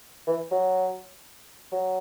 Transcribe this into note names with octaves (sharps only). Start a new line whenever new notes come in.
E3
F#3
F#3